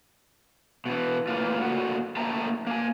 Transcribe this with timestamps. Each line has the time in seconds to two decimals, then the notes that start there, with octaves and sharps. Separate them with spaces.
0.86 B2 E3
1.27 A2 E3 A#3 F4
1.59 A2 A#3 F#4 F#5
2.17 A2 A#3 E5 G5 A5 A#5
2.67 A#3 G#5